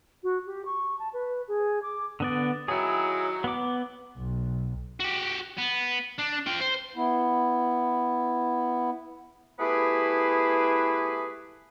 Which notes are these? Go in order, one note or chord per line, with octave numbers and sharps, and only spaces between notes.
F#4
G4
C#6
A5
B4
G#4
D6
D3 B3 D5
D#3 F#3 E4 G#4
B3 D6
B1
F#4 G4
B3
D4
F4 G5
C5
B3 E4
A3 B3 E4 G4 G#4 B4